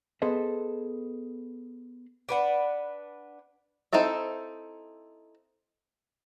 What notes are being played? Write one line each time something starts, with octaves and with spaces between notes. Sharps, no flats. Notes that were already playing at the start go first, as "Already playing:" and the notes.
B3 G#4 A4 C5 D#5
D4 B4 F#5
C4 D#4 E4 A4 E5